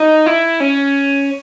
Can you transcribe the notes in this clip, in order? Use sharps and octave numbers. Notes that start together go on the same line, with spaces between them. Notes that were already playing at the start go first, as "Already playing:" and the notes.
Already playing: D#4
E4
C#4